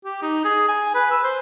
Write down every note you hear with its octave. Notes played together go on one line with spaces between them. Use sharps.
G4
D#4
G#4
G#5
B4
E6
C5